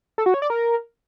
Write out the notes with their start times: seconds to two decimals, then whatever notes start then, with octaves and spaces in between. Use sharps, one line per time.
0.18 A4
0.26 F#4
0.34 C#5
0.42 D5
0.50 A#4